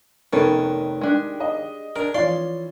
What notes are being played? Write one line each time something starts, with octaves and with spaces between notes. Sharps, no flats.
F1 D#3 A#3 B3 C#4 A4 B4
G#3 D4 G4
D#5
D4 G#4 A#4
E3 F3 C#4 D5 F5 C6